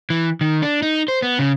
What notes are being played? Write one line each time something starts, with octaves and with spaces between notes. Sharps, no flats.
E3
D#3
D4
D#4
C5
B3
C#3